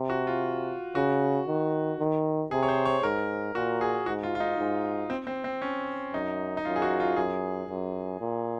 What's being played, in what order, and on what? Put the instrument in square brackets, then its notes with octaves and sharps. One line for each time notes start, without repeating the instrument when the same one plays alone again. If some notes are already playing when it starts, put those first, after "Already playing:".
Already playing: [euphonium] C3
[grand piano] F#4
F4
[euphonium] C#3 [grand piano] F#4
[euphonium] D#3
D#3
[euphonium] C3 [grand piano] G#4
[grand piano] C#5
C5
C#5
[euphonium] G#2 [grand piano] A#4
[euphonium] A#2 [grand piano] F#4
[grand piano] G#4
[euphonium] G#2 [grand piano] F#4
[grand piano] F4
F4
D#4
[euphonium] G#2
[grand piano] C4
C4
C4
C#4
[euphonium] F#2 [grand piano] D#4
[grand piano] D#4
[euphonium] F#2 [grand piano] F4
[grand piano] G#4
F#4
F4
[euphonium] F#2 [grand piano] G#4
[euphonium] F#2
A#2